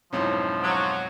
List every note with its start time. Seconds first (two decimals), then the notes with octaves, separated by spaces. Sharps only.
0.13 B1 F2 G#2 F3 C#4 D#4 E4
0.63 F#3